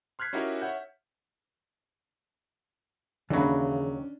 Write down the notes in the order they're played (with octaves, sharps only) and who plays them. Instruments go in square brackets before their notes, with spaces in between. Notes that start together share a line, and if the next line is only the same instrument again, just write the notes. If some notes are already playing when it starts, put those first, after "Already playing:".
[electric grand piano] C6 F6 F#6 G#6 B6 C7
C#4 D#4 E4 F#4 G4 A#4
C#5 E5 F#5 G6
[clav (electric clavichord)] D#2 F#3 [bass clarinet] C#3 [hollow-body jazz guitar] E3 B5 [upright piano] C#4 D4